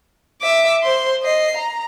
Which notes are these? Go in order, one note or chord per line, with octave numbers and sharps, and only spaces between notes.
E5 D6
C5 C6
D#5 C7
A#5